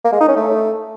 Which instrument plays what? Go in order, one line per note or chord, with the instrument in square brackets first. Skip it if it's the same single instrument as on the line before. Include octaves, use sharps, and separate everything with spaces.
[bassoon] A#3
G#3
D#4
C#4
A3